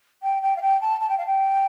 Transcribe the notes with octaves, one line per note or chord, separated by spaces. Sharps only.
G5
G5
F5
G5
A5
A5
G5
F5
G5